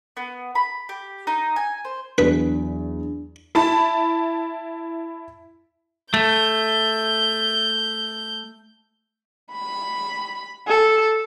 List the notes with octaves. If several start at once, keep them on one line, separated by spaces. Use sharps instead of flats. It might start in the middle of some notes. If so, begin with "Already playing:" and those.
B3
B5
G4
D#4
G#5
C5
E2 F#3 D4 B4
E4 A5 B5
A3 G6
B5
A4